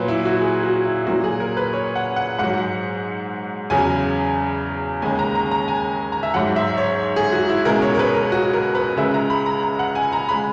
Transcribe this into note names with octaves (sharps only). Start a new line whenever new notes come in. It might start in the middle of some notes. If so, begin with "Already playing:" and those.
Already playing: A#2 F#3 B4
E4
F#4
G#4
F#4
E4
A#2 F#3 F#4
G#4
A#4
B4
C#5
F#5
F#5
G#2 F#3 F#5
E2 C#3 F#3 G#5
D#2 C#3 G#3 G#5
A#5
A#5
A#5
G#5
A#5
E5
G#2 F#3 F#5
E5
C#5
G#4
F#4
E4
C#2 B2 G#3 A#4
C#5
A#4
B4
A#4
F#4
A#4
B4
C#2 C#3 G#3 E5
A#5
B5
A#5
A#5
F#5
G#5
A#5
C#3 G#3 B5